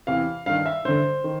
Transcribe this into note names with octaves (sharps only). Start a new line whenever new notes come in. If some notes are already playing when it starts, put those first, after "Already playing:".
E2 C3 E3 F5
G2 D#3 F5
E5
G2 D3 C5
D#3